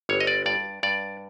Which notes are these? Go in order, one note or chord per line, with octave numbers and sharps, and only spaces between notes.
G1 C#5
D#5
D5
G2 D5
G2 D5